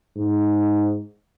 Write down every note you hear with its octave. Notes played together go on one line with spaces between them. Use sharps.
G#2